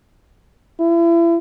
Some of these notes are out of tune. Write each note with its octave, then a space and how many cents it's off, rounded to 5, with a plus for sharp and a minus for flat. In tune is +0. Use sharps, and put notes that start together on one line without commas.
E4 +35